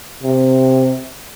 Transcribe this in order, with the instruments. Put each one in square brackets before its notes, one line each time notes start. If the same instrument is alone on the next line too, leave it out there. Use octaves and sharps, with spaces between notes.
[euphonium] C3